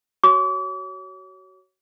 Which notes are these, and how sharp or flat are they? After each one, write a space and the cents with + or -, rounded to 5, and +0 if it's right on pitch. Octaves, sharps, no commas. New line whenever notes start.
F#4 +25 C#5 +0 D6 -40